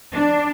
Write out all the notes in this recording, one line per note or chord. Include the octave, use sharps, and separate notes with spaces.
D4